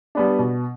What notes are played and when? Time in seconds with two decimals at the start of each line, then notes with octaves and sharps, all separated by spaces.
0.15 G3 B3 D4
0.39 B2